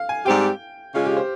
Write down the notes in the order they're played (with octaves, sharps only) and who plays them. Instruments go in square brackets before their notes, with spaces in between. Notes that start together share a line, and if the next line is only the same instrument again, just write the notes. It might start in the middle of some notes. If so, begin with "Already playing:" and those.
Already playing: [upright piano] F5
G#5
[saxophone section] G#2 G3 C4 G4 [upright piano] G5
[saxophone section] C#3 G#3 C#4 F4 G#4 [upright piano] F5
[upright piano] G4
C5